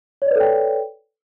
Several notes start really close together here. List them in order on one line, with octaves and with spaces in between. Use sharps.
C#5 D5 B4 A4 G5